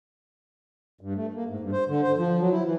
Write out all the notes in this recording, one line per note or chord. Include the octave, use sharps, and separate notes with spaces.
G2
A3
A#3
G#2
G2
C5
D3
C5
F3
F#3
E4
E3